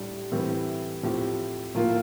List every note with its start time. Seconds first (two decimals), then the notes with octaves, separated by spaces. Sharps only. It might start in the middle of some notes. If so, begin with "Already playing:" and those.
Already playing: A2 G3 D4
0.32 A2 E3 G3 C4
1.03 A2 F3 C4 G4
1.75 A2 F3 A#3 F4